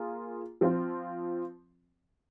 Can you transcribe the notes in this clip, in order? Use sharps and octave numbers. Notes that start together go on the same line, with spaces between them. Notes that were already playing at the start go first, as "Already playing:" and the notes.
Already playing: A#3 F4 G#4
F3 C4 F4